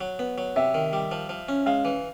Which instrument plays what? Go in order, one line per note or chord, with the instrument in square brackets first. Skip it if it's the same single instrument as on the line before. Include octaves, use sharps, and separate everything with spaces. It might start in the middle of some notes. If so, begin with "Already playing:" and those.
[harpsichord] F#3
B3
F#3
[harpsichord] C3 [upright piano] E5
[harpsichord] D#3
G3
F3
F3
C#4
[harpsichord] G#3 [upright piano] F5
[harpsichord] E3